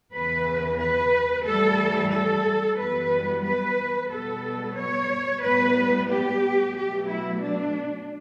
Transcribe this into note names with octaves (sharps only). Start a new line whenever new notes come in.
E2 C#3 E3 B4
B4
A2 E3 G3 A4
A4
F#2 E3 G3 B3 B4
B4
B2 G3 B3 A4
C#5
A2 G3 B3 B4
G4
B2 F#3 A3 G4
E4
D4